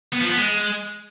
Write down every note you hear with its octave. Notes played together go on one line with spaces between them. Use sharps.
B3
F3
B3
G#3